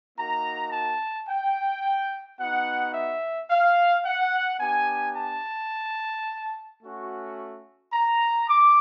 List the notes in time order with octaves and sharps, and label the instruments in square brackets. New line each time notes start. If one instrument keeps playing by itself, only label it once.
[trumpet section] A#3 D#4 F#4 A#5
A5
G5
B3 D#4 F#4 F#5
E5
F5
F#5
B3 D4 G4 G#5
A5
A3 C#4 F#4
A#5
D6